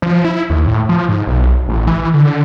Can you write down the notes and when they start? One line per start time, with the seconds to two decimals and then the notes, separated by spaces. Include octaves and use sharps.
0.02 F3
0.25 E4
0.50 D#2
0.67 A2
0.89 F3
1.09 G#2
1.27 B1
1.69 A1
1.87 E3
2.14 D3